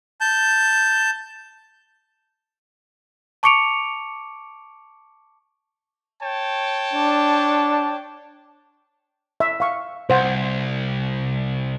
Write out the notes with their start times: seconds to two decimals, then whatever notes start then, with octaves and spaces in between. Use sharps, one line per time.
0.21 A5 G6
3.43 A5 C#6 D6 C#7 D7 F7
6.23 C#5 G5 A5
6.94 D4
9.40 E5
9.60 F5 C#6
10.10 C2 C5 F#5